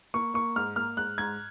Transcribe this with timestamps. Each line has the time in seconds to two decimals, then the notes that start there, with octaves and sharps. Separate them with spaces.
0.14 A#3 C#6
0.34 A#3 C#6
0.56 G#2 F6
0.76 A#3 F6
0.97 G#2 F#6
1.18 G#2 G#6